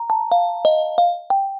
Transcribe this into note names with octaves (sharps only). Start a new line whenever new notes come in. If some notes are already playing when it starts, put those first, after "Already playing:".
Already playing: A#5
A5
F5
D#5
F5
G5